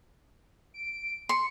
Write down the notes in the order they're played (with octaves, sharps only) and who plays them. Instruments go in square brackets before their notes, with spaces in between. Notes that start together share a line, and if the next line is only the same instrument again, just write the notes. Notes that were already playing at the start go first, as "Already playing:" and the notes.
[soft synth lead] D7
[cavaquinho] C6 [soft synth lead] C#7